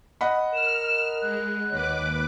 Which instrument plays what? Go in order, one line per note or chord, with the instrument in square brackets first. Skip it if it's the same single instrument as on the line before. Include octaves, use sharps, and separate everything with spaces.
[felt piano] D#5 F#5 B5
[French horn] A#4 [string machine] F6 [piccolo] E7
[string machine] G#3 [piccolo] F#6
[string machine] D#2 B4 D6 [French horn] C#5